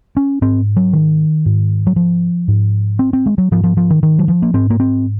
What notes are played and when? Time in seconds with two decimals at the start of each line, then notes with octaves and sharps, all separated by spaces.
0.17 C#4
0.42 G#2 C4
0.76 F#3
0.93 D#3
1.46 G#2
1.87 F#3
1.96 F3
2.48 G#2
2.99 C4
3.13 C4
3.26 G#3
3.38 F#3
3.51 G#2 F3
3.64 F3
3.77 F3
3.90 D#3
4.03 D#3
4.19 F#3
4.28 F3
4.42 A#3
4.54 G#2 C4
4.70 A#3
4.80 C4